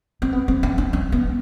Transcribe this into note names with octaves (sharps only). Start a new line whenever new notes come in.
C4
B3
C4
C#4
D4
C#4
B3